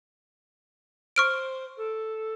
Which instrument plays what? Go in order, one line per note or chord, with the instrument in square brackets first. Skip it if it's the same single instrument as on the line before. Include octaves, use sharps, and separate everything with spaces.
[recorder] C5 [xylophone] C#6 F6 D7
[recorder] A4